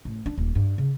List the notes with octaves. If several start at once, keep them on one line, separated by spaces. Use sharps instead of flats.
A1
D4
D#1
G2
C#3